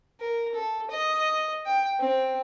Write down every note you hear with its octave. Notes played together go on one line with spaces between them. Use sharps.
A#4
A4
D#5
G5
C4